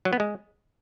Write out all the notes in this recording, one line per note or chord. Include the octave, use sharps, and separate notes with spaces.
F#3
B3
G#3